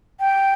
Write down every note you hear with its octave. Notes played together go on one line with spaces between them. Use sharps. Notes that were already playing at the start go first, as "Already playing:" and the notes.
G5